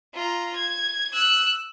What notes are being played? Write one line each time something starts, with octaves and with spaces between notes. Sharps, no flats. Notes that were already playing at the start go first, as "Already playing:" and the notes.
F4 A#5
G#6
E6 F#6